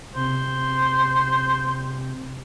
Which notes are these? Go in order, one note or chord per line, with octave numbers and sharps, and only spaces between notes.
C3 C5